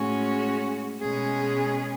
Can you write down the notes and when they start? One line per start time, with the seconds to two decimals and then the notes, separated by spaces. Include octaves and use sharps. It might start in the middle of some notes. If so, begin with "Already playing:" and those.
Already playing: A2 G#3 C#4 F#4
1.02 B2 G#3 C#4 G#4